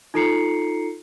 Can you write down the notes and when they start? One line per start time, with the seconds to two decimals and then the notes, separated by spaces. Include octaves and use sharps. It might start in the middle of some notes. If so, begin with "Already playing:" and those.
0.14 D#4 F4 A4 A#5 C7 C#7